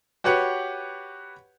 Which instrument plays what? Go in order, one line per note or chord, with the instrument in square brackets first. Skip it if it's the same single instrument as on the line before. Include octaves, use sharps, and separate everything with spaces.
[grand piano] F#4 G4 B4 C#5 F#5